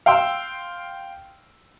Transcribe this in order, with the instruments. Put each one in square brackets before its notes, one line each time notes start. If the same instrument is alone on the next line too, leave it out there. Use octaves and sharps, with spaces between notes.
[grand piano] F5 G5 C6 E6